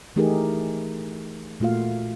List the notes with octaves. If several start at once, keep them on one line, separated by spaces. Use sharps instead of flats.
E3 A3 D#4 G4 G#4 A#4
A#2 A3 A#3 F4 F#4 F5